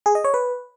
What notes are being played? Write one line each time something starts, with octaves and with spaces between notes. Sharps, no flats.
G#4
D#5
C#5
B4